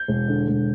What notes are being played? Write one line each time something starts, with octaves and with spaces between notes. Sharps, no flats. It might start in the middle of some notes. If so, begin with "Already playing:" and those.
Already playing: G6
E1
D3
E1